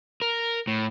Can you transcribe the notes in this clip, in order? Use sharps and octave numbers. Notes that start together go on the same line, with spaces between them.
A#4
A2